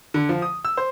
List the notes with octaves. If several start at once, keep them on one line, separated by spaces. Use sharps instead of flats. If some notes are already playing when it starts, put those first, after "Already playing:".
D3
F3
D#6
E6
C5